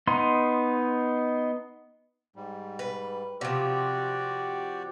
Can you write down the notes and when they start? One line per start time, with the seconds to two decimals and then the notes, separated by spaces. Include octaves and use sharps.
0.07 B3 D#4 C6
2.36 G#2 G3
2.79 B4
3.41 C3 F3 F#4 G4 D5